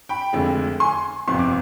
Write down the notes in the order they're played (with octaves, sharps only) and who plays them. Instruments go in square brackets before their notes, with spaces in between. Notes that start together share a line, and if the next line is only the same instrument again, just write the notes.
[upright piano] G5 B5
F1 F2 D3 G#3
G#5 C6
G1 F2 C3 C6
D6